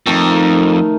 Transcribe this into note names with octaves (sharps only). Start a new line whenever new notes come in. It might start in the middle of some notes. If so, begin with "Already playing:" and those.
F2 D#3 A3